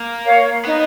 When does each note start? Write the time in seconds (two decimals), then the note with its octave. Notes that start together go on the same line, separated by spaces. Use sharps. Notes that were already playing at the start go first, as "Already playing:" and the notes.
Already playing: A#3
0.25 A#4 C#5 F5
0.65 B3 D#4